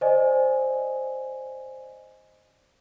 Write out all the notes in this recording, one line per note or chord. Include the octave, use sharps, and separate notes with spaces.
C5 D5 D#5 G#5